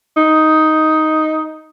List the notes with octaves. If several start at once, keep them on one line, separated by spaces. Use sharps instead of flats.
D#4